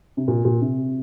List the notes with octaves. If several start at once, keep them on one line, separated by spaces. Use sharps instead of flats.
C3
A#2
A#2
C3